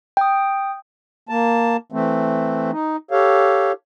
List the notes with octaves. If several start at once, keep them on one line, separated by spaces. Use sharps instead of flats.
G5 D#6
A#3 A5
E3 A3 C4
D#4
G4 A4 C#5 F5